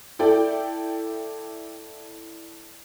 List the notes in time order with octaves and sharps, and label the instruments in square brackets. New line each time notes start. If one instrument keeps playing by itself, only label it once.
[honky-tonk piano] E4 A4 D5 G5